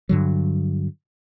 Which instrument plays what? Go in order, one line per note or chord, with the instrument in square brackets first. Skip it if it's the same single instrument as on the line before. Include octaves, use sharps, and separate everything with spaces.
[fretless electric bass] G2 D3 F#3